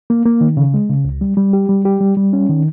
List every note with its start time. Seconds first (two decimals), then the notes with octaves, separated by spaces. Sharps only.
0.10 A#3
0.26 A#3
0.41 D#3
0.57 C#3
0.74 G#3
0.89 C#3
1.05 C#2
1.21 G3
1.37 G3
1.53 G4
1.69 G3
1.85 G4
2.01 G3
2.17 G3
2.33 C#4
2.49 D#3